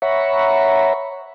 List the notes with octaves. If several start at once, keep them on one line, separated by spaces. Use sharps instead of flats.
C#5 E5 F#5 A#5 B5 C#6